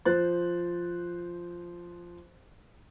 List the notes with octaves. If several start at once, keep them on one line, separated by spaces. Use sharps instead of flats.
F3 C5 F#6 A6